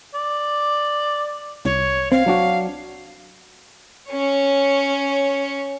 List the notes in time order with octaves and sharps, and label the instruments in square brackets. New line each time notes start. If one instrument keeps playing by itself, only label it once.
[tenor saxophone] D5
[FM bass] C2 [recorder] C#5
[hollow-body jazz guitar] C4 [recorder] F5
[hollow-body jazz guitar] F#3 D4 F#4
[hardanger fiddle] C#4 C#5